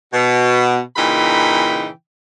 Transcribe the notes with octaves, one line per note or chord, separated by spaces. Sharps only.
B2
A#2 C#3 E3 D#4 G5 B5